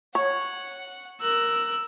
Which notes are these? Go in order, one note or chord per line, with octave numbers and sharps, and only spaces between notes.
C#5 F#5
A#4 E6 F#6